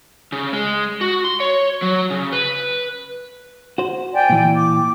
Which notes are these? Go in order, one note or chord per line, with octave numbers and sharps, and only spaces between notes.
C#3
G#3
F#4
C6
C#5
F#3
C#3
B4
F#4 C5
D5 G5 G#5
A#2 E3
D6